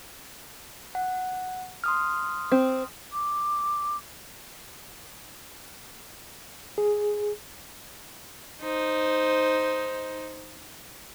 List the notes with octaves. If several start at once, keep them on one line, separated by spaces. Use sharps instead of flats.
F#5
C6 D#6 F6
C4
D6
G#4
D#4 C5